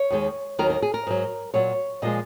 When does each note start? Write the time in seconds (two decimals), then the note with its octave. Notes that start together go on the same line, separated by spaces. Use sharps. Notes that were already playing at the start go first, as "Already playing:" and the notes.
Already playing: C#5
0.10 D#2 D#3 G#3
0.59 D#2 D#3 F#3 A#4
0.70 A#4
0.82 G#4
0.94 A#4
1.07 G#2 F#3
1.54 A#2 F#3 C#5
2.02 A#2 F3 G#3 D#5